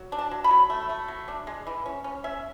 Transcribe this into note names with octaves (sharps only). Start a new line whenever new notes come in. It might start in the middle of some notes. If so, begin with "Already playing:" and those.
Already playing: F#3
D4
A5
F#3
B5
F#3
A3
A3
F#3
D4
G#3
E3
C#4
C#4
C#4 E5